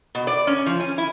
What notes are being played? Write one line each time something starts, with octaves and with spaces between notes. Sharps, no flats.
B2
D5
C#4
F3
C#4
E4